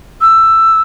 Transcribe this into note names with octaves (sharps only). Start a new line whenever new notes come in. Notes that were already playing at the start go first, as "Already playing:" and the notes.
E6